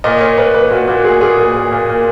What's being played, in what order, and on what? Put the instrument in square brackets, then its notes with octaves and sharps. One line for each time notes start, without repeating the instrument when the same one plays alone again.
[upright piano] A#2 D#5
A#2 C#5
A#2 B4
A#2 B4
A#2 F#4
A#2 F#4
A#2 G#4
A#2 G#4
A#2
A#2
A#2
A#2